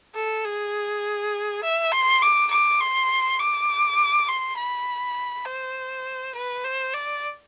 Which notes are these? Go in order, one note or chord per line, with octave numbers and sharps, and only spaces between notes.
A4
G#4
E5
C6
D6
D6
C6
D6
C6
B5
C5
B4
C5
D5